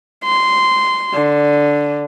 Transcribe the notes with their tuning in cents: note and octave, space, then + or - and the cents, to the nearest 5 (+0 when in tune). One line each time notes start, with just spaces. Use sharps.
C6 -10
D3 -5